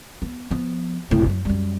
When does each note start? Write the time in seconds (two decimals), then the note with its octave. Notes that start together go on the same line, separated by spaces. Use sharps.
0.22 B3
0.51 F3 B3
1.11 F1 A2
1.26 F#2 F#3
1.45 F#2 G3